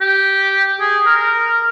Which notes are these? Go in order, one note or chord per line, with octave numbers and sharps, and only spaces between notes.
G4
G#4
A#4